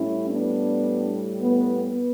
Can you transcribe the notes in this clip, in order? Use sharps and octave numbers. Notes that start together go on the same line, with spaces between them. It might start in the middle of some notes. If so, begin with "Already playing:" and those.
Already playing: A2 G3 C#4 E4
B3 D4
B3
B3